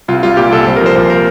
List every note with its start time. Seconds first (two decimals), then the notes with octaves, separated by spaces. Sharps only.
0.08 C2 F4
0.23 G3 F4
0.37 A#2 G4
0.51 C2 A4
0.67 C2 C5
0.76 A#4
0.81 F3 C5
0.96 A#2 C5
1.10 A#4